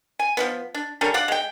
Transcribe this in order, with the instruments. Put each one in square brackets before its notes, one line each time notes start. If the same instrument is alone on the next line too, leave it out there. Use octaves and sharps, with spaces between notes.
[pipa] G#5
F3 F#3 B3
D4
D3 G3 C#4 A#4
D5 F5 F#5
G#3 G5